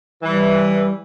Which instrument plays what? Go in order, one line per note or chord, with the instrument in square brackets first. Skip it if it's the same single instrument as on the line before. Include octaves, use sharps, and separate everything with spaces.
[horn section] E3 [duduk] G3